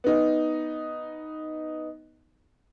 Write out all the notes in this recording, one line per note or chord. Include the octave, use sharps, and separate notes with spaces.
B3 D#4